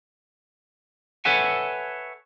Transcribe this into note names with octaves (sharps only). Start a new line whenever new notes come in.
A4 B4 C#5 E5 F#5 G#5